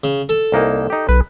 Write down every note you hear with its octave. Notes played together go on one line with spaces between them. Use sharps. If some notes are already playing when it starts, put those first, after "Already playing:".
C#3
A4
C2 A#3 D#4
D#4 G4
B1 B4